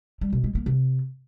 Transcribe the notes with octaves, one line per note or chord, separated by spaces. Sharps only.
G3
B2
G#3
A#3
C3